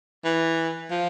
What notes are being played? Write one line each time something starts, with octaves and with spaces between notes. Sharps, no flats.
E3
F3